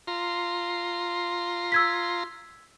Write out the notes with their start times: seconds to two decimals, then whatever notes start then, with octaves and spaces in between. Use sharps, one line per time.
0.07 F4 A#5 C6
1.72 E6 G#6 B6